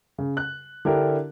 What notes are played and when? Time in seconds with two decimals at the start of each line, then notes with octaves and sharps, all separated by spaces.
0.18 C#3
0.37 F#6
0.85 D3 D4 E4 G4 A#4